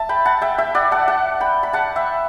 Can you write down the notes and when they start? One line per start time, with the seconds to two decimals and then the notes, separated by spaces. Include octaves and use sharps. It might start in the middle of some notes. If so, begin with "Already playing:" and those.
Already playing: E5 A5
0.09 G5 B5
0.25 F#5 A5
0.42 E5 G5
0.58 E5 G5
0.75 D5 F#5
0.91 F#5 A5
1.08 F#5 A5
1.40 G5 B5
1.63 B5
1.73 F#5 A5
1.96 E5 G5